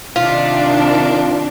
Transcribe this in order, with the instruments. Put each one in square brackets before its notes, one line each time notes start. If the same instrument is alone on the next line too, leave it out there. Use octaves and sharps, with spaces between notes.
[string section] C3 D#3 D4 [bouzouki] F4 [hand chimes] F5